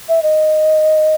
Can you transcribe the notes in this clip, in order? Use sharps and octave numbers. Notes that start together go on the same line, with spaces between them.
E5
D#5